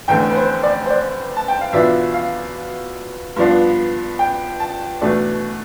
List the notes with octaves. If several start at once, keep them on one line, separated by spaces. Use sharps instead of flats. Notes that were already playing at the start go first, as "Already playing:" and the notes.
F1 E2 D3 A3 G5
B4
C5
D5
C5
D5
A5
G5
F5
E2 B2 B3 D4 F4 E5
F5
G2 F3 B3 D4 F4
G5
A5
E2 B2 A3 D4